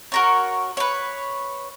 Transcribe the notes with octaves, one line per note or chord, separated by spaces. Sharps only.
F#4 A#4 C#5
B4 C#5